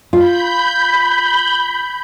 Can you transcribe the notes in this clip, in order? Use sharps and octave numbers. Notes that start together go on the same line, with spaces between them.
F4 B5 G6